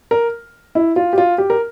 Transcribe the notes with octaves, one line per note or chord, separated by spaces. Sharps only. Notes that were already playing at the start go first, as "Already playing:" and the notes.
A#4
E4
F4
G4
F4
G4
A#4